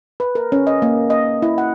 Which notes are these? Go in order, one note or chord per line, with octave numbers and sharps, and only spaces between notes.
B4
A#4
C#4
D#5
A#3
D#5
E4
F#5